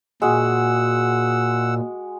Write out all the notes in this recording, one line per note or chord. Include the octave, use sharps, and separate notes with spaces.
A#2 G#3 F#4 F#5 E6